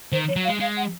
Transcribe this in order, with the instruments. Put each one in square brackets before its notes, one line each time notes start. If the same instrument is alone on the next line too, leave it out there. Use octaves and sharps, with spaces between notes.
[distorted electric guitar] D#3 [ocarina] C5
[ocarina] C#5
[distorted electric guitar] F#3
[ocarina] F5
[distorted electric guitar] G#3
[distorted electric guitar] G#3 [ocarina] F5
[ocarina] F#5